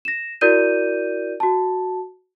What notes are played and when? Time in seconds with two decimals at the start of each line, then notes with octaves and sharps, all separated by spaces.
0.05 A#6 E7
0.41 E4 F#4 A#4 D5 G6 D#7
1.40 F#4 A5